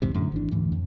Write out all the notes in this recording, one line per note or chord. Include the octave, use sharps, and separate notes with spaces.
B1 E2 G#2 C3
F#2 A2 D3
G#1 E3 D4
D2 G#2 E3
F2